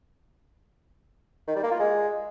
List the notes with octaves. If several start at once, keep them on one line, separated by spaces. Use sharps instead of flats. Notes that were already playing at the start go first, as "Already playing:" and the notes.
D#3
G3
A#3
F4
G#3